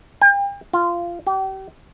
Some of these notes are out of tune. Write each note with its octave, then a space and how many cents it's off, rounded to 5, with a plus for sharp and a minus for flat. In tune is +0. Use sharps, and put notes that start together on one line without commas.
G5 +40
F4 -15
G4 -35